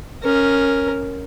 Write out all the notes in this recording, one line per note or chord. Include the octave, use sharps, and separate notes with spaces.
C#4 A#4